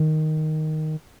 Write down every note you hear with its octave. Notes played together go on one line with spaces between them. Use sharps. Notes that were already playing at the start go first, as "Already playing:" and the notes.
Already playing: D#3